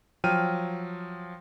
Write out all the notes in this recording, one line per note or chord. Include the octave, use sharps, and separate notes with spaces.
F3 F#3 G5 F6 D#7